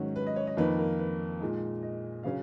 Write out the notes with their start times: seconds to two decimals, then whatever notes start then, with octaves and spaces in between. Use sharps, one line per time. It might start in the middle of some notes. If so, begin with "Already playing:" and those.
Already playing: G#2 D#3 F#3 C#4 F#4
0.16 B4
0.27 D#5
0.36 C#5
0.47 D#5
0.57 F2 D#3 A#3 D#4 B4
0.79 A#4
0.99 B4
1.41 A#2 G#3 D#4
1.83 D#5
2.23 C#3 F#3 C#4 F5